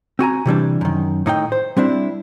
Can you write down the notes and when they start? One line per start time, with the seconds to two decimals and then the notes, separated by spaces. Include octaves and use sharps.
0.19 C4 F#4 G#5 A#5
0.46 C3 E3 G3 D4
0.81 F#2 D#3
1.26 A2 D#4 C#5 G5
1.52 C5
1.77 G3 C4 D4 E4